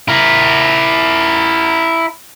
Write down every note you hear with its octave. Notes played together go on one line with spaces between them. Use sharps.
E4 A#4